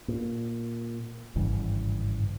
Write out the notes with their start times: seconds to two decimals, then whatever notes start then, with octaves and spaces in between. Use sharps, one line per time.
0.08 A#2
1.36 G#1 G2 C#3 E3